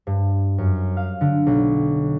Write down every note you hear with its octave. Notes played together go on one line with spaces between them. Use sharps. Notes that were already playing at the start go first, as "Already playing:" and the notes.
G2
F#2
F5
D3
B1